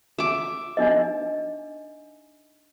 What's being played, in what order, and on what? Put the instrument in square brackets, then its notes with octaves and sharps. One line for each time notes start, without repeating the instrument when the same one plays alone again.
[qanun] E5 D6
[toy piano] D4 D#4 D#5